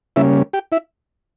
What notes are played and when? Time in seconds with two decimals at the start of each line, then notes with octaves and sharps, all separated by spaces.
0.16 C#3 G3 A#3 C#4 E4 E5
0.53 G4 G5
0.72 E4 E5